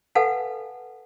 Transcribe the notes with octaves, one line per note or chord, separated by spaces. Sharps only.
A4 B4 F5 F#5 G#5 A5